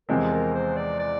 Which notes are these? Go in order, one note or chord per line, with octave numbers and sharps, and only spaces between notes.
E2 C3 F3 G#3 C4 A#4
A#4
C5
D5
D5